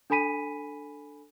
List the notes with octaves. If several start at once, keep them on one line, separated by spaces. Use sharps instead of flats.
D4 A4 G#5 B5 B6 D#7